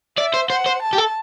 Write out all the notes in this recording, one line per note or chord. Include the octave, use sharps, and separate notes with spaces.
D5 E5
C5
C5 F#5
C5
A5
G4
A4